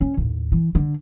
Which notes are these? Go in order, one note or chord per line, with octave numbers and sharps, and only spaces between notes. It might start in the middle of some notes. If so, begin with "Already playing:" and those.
C#4
D#2 A2
E3
D3